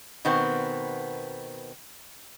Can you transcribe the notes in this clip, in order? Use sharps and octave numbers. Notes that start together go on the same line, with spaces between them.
B2 D#3 B3 C4